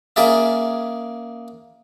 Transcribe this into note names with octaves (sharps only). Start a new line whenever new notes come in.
A#3 C#4 G#4 D5 E5